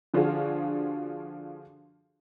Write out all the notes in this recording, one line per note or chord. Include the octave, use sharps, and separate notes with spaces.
D3 F3 D4 F4 F#4 G#4